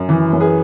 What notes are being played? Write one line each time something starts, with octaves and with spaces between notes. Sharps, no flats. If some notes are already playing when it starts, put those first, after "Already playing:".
Already playing: F#2
E3
F#2
G#4 B4